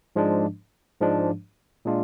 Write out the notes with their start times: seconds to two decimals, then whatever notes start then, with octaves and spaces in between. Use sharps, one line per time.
0.16 G#2 F3 G#3 D4
1.00 G#2 F3 G#3 D4
1.85 A#2 G#3 D4 F4